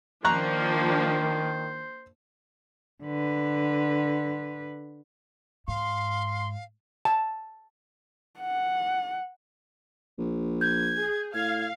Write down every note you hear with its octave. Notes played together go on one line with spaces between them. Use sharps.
D#3 F3 A#3 D4 C5 A#5 C#6 F#6
D3 B4
G#2 F5 C6
A5
F#5
A#1
G6 G#6
G#4
A2 F5 G#6